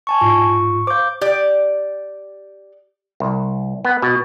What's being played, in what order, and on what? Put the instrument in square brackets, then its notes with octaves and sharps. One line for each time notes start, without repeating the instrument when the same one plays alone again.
[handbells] G#5 A5 C#6
[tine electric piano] G#2 F4 [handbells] C#6
[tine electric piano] C5 F5 [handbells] D6 G6
[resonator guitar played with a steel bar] G4 D5
[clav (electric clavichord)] C2
B3
B2